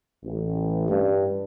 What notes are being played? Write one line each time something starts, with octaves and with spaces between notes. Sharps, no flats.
A1
G2